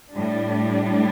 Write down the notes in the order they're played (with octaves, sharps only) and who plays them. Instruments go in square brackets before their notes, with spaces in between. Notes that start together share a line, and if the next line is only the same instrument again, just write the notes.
[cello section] A2 G3 D4